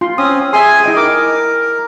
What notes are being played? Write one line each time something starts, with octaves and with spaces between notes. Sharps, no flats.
F4 C6
C4 C#4 D#6
G#4 E5 G#5 C6
E4 D#5 G5
D#4 A#4 D6